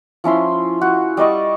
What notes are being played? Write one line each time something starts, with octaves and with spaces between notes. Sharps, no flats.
F3 C#4 E4 C6
F#4
G3 D5 D#5 C#6